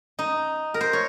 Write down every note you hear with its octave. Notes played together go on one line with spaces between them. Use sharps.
D#4
A#4
C5
C#5